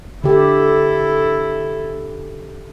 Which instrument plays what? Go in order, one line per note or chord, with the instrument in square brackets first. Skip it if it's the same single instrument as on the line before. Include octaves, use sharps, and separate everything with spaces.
[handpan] D3 G4 [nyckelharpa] E4 A4